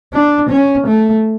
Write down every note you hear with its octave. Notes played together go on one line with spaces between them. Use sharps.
D4
C#4
A3